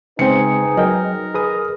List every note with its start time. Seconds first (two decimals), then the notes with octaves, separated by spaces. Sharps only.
0.19 C#3 G#3 C4 D#4 G#4 B4 C#7
0.77 F#3 A#4 D#5 G5
1.34 G#4 B4 D#6